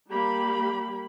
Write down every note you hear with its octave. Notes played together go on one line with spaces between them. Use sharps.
G3 A#3 G4 B5